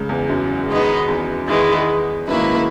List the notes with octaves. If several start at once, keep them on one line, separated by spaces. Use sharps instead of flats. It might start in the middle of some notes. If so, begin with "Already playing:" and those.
Already playing: C#2 C#3
E2
F#2
D#3 G#3 B3 D#4
E2
D#3 G#3 B3 E4
F#2 D#3 A#3 E4 B4
G#2